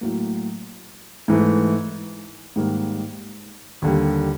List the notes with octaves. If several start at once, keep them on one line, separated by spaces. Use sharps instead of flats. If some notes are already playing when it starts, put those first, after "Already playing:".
A2 F#3 A#3
G#2 E3 A3
G#2 D#3 G3 A#3
D#2 D3 G3